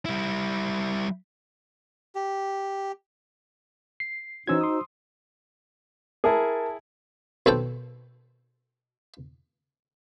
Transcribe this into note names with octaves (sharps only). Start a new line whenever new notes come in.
G3 E4
G4
C7
E3 C#4 D#4 F#4 C5 E6 G#6
C6 D#6
E4 G#4 A#4 A5
B1 C4 A4 G5